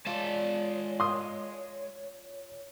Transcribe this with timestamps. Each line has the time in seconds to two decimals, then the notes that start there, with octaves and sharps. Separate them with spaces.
0.07 G#3 F4 C#5 D5 A5
1.00 C6 D#6